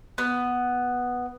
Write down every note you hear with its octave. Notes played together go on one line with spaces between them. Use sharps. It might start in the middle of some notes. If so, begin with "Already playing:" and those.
B3